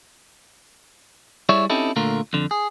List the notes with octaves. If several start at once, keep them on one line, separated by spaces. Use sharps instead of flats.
G3 E4 G#4 C#5 D5 E5
C4 C#4 D#4 E4 G4 A4
A#2 D3 A3 F4 A#4
F2 D3
G#4